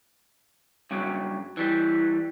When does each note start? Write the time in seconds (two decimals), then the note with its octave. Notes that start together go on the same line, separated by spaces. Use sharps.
0.91 G2 C#3 F#3
1.57 E3 G3